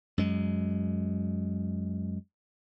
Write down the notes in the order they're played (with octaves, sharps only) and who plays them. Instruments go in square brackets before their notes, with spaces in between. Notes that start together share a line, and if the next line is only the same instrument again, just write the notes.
[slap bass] F#2 G#3